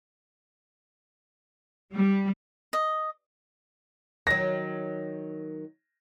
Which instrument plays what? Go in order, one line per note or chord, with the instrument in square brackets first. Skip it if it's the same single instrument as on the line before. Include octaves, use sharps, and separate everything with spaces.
[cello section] G3
[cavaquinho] D#5
[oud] D#3 F#3 [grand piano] A#6